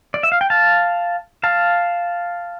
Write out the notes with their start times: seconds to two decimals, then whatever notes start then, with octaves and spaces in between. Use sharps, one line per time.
0.14 D5
0.23 E5
0.32 F5
0.41 G5
0.50 F5 A5
1.43 F5 A5